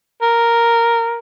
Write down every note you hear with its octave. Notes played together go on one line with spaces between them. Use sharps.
A#4